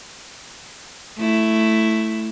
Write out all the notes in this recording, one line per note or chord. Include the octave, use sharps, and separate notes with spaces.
A3 E4